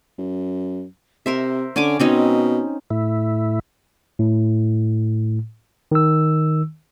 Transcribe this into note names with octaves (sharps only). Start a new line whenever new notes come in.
F#2
C3 A#4 C5 E5
D3 C#4 G#5 D6
B2 C4 C#4 D#4
A2 E4
A2
D#3 E6